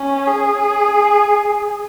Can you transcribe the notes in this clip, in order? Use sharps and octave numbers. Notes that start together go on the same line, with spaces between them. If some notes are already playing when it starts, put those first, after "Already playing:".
Already playing: C#4
G#4